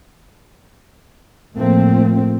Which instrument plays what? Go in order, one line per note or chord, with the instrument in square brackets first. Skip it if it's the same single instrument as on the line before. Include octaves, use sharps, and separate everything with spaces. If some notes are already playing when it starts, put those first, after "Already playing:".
[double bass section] A2 F3 A3 A#3 C4